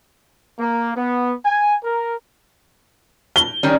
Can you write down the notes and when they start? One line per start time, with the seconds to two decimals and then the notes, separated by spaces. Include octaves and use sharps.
0.59 A#3
0.96 B3
1.45 G#5
1.84 A#4
3.36 G7
3.63 D#3 G3 C#4